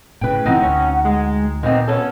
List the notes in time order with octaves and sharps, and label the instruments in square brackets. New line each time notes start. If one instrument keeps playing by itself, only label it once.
[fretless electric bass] A2 C#3 [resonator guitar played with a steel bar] B4 G5
[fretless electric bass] A2 E3 [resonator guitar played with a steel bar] C4 D#4 [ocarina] F#5
[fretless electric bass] D2 [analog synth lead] C#4
[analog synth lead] G#3
[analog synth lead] A#2 [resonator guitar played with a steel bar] D#3 B3 C4 [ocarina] D#5
[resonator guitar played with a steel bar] B3 C#4 A4 [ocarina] C#5